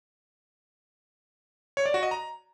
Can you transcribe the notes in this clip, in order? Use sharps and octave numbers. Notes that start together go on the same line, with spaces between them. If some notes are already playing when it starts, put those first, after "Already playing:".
C#5
D5
F#4
D#5
A#5